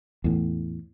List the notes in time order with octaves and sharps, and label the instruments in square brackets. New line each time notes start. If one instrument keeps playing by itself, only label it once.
[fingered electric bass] E2 A2